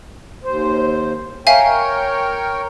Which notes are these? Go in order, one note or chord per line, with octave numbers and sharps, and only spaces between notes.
D#2 C5
A#4 C#5 E5 F5 G5 G#5